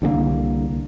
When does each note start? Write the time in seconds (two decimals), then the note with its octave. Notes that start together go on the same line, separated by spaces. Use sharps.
0.02 C2 D3 G3 A#3